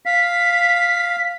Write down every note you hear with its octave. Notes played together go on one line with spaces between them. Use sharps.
F5 B6